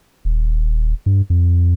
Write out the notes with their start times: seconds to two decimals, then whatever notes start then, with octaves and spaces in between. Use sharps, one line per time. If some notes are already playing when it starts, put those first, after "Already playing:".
0.25 D#1
1.06 G2
1.30 F2